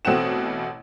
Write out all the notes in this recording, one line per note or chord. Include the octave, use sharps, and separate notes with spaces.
A1 B2 A3 C4 F#5 E7